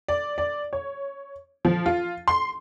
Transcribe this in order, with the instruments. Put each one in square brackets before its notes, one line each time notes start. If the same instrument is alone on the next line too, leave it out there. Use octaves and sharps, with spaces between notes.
[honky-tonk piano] D5
D5
C#5
F3
F4
C6